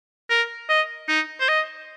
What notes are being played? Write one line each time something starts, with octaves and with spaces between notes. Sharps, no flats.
A#4
D#5
D#4
C5
D#5